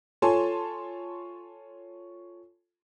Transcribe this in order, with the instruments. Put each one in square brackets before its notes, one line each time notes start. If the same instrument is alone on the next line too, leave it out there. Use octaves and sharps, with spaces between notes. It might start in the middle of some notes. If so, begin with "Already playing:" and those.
[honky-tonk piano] F4 A4 C#5 G#5 A5 C6